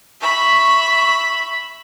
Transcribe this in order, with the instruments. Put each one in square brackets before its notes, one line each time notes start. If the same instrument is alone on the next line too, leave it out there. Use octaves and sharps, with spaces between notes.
[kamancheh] E5 B5 [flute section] C#6